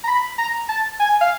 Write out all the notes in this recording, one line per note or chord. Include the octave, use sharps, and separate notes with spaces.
A#5
B5
A#5
A5
G#5
F5